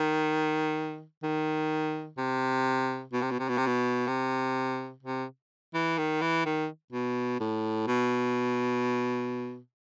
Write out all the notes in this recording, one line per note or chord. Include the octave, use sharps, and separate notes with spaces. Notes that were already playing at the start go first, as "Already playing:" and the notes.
Already playing: D#3
D#3
C3
B2
C3
B2
C3
B2
C3
B2
C3
C3
E3
D#3
E3
D#3
B2
A2
B2